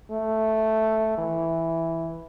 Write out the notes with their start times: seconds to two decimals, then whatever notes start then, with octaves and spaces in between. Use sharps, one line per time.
0.11 A3
1.18 E3